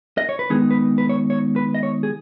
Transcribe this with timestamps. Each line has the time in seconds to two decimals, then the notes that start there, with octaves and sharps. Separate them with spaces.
0.18 D#5
0.29 C#5
0.39 B4
0.50 D#3 G#3 B3 D#4 G#4
0.71 B4
0.98 B4
1.09 C#5
1.30 C#5
1.56 B4
1.74 D#5
1.83 C#5
2.03 G#4